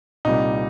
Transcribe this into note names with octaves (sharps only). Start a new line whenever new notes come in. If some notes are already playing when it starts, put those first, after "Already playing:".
C2 A#2 G3 D#4